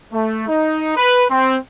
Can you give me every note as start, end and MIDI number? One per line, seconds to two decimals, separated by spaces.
0.12 0.46 57
0.48 0.93 63
0.96 1.24 71
1.30 1.56 60